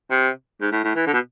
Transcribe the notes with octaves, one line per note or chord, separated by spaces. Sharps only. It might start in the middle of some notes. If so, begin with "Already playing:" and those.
C3
G#2
A2
A2
E3
D3
B2